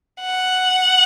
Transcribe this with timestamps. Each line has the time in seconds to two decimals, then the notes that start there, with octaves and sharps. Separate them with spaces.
0.22 F#5